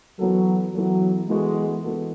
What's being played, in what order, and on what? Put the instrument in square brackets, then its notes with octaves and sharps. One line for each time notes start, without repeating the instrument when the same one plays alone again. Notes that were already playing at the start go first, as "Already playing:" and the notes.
[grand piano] E3 B3 F#4 A4 [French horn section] F#3
[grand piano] E3 B3 F#4 A4 [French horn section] F#3
[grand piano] E3 B3 F#4 A4 [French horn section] G#3
[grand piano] E3 B3 F#4 A4